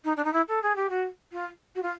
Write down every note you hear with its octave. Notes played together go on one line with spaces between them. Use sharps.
D#4
D4
D#4
E4
A4
G#4
G4
F#4
F4
F#4
F4